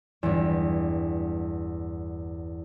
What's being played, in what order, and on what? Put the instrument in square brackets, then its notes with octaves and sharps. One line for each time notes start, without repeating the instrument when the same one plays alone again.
[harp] G1 E2